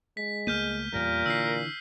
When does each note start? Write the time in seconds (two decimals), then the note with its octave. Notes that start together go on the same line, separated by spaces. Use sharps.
0.17 G#3 B6
0.47 C#2 A3 A#3 F6 G6 D#7
0.93 E2 A#2 G3 A#4
1.26 D3 E3 E6 B6 C7